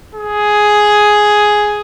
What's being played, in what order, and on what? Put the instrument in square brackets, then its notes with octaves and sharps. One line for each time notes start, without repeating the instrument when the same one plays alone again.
[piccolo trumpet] G#4